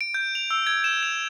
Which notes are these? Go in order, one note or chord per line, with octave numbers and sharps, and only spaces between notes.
D7
G6
F7
E6
G#6
E7
F7